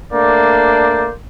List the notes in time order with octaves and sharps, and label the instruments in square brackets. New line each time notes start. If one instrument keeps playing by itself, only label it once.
[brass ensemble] A3 A#3 D4 C5 D5